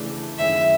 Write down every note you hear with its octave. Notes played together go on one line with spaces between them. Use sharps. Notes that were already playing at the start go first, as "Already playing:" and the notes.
Already playing: C#3 E3 A3 D4
F#2 D#3 G#3 C#4 E4 E5